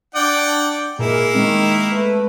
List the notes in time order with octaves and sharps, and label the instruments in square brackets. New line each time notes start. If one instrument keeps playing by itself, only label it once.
[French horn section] D4 [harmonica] D5 F#5 G5
[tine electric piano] A#2 [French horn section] G#3 G#4 A#4 [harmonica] A#3 E4
[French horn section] D#3 [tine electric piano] G#3 C4
[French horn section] A3 B4